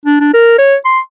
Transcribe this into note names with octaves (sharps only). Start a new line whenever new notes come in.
D4
D4
A#4
C#5
C6